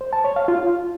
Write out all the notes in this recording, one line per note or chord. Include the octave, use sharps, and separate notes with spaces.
C5
A5
C#5
F5
F4